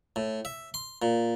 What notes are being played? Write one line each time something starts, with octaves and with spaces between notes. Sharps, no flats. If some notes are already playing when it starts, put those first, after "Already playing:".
A2
E5
C6
A#2